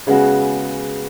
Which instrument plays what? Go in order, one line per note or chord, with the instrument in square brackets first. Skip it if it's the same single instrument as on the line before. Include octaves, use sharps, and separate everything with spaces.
[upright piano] C#3 G#3 B3 F#4